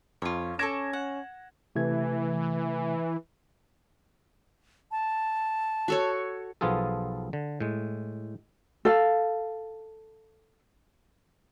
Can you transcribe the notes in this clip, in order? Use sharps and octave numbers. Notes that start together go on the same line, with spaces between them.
F2 F4 C#5
C#4 A4 C#6 D6 G#6 A#6 E7
F#5
C3 E3 A3 G#6
A5
F#4 A4 C#5
B1 F3 B3 F4 G#4 A4
D3
A2 G#3
A4 F5